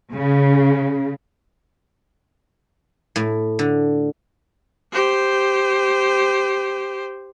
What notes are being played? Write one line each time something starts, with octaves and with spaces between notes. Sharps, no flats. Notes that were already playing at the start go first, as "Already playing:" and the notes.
C#3
A2
D3
G4 C5